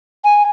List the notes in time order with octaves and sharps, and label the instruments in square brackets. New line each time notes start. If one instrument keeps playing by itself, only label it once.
[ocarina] G#5